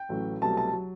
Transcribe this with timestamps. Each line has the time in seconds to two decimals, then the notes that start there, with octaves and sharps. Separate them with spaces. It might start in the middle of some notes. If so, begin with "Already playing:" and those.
Already playing: G5
0.09 A1 A2 F#3 A3
0.42 C2 B2 F#3 A3 A5
0.57 A5
0.73 F#3